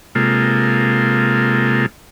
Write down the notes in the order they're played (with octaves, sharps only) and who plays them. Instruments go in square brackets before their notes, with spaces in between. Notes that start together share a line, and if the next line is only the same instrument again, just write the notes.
[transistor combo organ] C3 G#3 A#3 F4 A4